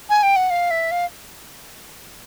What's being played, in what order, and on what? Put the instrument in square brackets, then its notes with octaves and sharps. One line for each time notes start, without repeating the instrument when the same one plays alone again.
[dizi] G#5
G5
F#5
F5
E5
F5